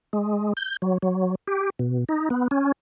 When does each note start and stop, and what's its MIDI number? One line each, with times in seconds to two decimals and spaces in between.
0.13 0.53 56
0.57 0.77 91
0.82 0.98 54
1.02 1.35 54
1.47 1.70 67
1.79 2.04 47
2.09 2.29 63
2.30 2.48 59
2.51 2.72 61